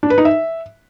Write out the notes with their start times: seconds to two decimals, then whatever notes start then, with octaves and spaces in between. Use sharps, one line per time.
0.03 D4
0.10 B4
0.18 D#4
0.25 E5